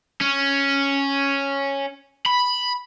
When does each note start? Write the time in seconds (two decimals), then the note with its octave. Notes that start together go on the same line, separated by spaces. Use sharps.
0.21 C#4
2.26 B5